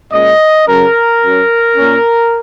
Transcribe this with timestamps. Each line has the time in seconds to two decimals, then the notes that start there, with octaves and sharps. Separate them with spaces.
0.12 A#2 G#3 C#4 D#5
0.66 C#3 F#3 C#4 A#4
1.21 F#2 F#3 C#4
1.77 A#2 A#3 C#4